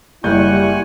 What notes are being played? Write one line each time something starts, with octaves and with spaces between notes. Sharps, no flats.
F#1 G3 E4 F#5 G#5 C#6 G6